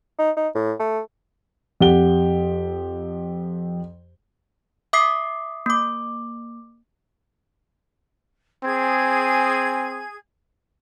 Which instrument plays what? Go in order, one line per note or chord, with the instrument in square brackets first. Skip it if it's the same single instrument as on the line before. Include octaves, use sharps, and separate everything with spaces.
[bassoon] D#4
D#4
A2
A3
[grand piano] F2 G4 F#5 G7
[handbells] E5 D6 D#6 B6 C7
A#3 D6
[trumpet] C4 [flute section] G#4 G#6